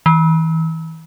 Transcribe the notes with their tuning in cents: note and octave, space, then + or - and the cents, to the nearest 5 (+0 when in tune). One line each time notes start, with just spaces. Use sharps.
E3 -35